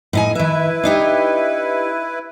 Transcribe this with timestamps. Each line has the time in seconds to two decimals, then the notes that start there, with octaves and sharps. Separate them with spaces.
0.13 A2 D#4 G#5
0.35 D#3 E4 B4 E5
0.83 D4 D#4 G4